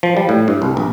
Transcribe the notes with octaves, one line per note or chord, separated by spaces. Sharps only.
F3
G3
A2
G2
C2
A#1